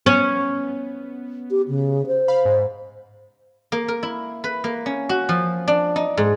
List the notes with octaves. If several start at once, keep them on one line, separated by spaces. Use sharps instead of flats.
B3 C#4
G4
C#3
C5
F5 B5
G#2
A#3
A#4
E4
B4
A#3
C#4
F#4
F3
D4
D#4
G#2